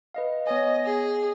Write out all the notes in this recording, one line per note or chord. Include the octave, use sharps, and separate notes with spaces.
B4 D#5 F5
B3 C#5 D#5 G#5
G#4